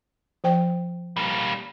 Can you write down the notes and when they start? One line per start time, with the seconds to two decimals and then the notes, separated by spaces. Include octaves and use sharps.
0.44 F3 C5 G5
1.17 G3 A#3